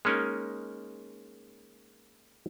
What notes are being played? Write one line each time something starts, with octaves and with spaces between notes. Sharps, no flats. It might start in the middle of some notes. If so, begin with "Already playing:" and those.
G#3 A#3 C#4 D#4 A#4